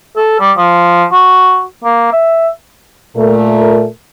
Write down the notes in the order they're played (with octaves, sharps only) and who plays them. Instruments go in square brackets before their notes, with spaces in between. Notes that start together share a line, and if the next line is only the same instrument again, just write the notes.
[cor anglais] A4
G3
F3
F#4
A#3
E5
[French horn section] A#2 A3 A#4